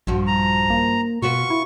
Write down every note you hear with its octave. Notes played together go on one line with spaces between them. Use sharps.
A#1 G2 F3 F#4
A#5
A#3
B2 F4 F#4 B4 C#6
E4